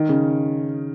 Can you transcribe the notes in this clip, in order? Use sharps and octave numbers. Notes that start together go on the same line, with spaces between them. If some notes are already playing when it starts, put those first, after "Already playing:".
Already playing: D#3
C#3